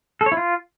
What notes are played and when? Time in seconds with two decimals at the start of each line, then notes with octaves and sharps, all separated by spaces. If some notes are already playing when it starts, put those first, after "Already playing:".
0.21 A4
0.26 C#5
0.32 E4
0.37 F4